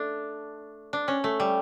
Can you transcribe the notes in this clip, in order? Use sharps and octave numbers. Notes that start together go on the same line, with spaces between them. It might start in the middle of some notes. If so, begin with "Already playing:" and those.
Already playing: A3 D4
D4
C#4
A3
G3